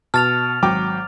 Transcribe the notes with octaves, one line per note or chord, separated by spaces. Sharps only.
B2 A5 F6 A6 F7
G#1 F#3 G5 D6